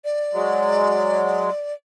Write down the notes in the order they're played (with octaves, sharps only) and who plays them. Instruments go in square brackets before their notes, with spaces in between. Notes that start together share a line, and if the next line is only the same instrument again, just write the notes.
[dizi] D5
[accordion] F#3 G#3